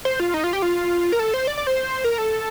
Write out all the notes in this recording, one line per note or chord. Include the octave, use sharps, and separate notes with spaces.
C5
F4
D#4
F4
G4
F4
A#4
A4
C5
D5
D5
C5
A#4
A4